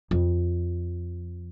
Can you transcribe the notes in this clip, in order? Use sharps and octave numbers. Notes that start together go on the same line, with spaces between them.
F2